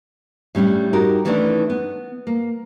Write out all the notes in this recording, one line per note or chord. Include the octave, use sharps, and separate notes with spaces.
A2 G3 C#4 D4
D#4 F#4 G4 A#4
D#3 E3 A3 C#4 D4 E4
B3
A#3